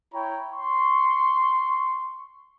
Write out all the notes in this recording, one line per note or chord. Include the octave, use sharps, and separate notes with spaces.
E4 C#5 G5 A#5 B5
C6 C#6